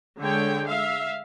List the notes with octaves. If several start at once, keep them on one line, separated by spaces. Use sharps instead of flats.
D3 G#3 C#5 G5
E5 F5